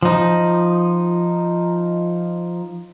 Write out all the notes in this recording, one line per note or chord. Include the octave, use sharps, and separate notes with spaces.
F3 D#4